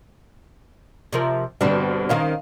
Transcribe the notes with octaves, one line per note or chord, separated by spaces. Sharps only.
C3 F3 A#4
G2 B2 D3 G3 C4 D4
D#3 C4 C#4 D#5 F5